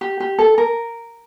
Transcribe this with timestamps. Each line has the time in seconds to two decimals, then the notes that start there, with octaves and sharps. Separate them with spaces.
0.01 G4
0.20 G4
0.39 A4
0.58 A#4